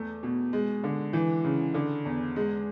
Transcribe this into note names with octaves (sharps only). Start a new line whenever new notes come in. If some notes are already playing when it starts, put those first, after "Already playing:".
Already playing: E2 A3
B2
G#3
D3
E3
C#3
D3
E2
G#3